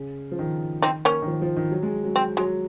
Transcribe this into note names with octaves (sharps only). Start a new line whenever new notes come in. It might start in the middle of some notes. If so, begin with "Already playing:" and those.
Already playing: C#3
F3
D#3
C4 D#4
A#3 C#4
D#3
F3
F3
D#3
F#3
G#3
F#3
C4
F#3 G#3